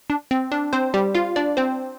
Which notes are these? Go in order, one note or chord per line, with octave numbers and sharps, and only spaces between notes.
D4
C4
D4
C4 C5
G3 G4
F4 F5
D4 D5
C4 C5